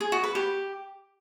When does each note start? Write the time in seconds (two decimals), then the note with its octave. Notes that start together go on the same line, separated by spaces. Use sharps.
0.01 G#4
0.12 F#4
0.24 B4
0.35 G4